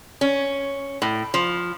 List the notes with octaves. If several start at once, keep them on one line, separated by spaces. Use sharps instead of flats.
C#4
A2
F3